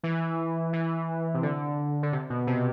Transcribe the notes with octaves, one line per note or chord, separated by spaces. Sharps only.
E3
E3
C3
D3
D3
C3
B2
C3